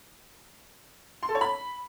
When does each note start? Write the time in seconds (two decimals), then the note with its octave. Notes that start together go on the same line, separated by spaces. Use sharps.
1.23 C6
1.29 A4
1.35 C#5
1.41 B5